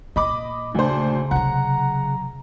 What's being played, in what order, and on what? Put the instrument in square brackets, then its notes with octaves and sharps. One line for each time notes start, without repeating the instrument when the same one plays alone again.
[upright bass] A#2 [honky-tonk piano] D#5 B5 D6
[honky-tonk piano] D2 C5 [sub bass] C#3 [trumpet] D4
[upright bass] C3 F#3 [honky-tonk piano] F#5 [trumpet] A#5